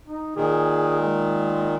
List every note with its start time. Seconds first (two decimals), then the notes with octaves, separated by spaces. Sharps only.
0.07 D#4
0.36 A#2 D#3 G#4
1.00 G#3